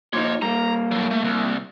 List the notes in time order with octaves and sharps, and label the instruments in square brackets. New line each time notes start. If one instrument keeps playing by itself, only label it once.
[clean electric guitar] A#2 F3 D#4 [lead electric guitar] C#5 C6
[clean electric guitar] G3 A#3 [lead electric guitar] A#5
[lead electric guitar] A2 F#3
A3
C2